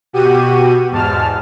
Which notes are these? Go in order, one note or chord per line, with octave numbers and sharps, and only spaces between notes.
B2 F#4 G4 D#7
E2 G#2 A5 F6